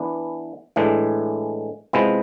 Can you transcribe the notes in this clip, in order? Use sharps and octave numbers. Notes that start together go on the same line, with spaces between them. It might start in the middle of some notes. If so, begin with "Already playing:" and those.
Already playing: E3 B3 D4
A2 E3 G#3 D4
C3 F3 G#3 B3 E4